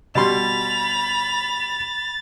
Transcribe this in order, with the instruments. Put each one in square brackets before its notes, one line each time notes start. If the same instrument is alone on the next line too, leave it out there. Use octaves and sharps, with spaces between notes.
[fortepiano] B2 G3 C6 [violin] B5 F7 [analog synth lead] A6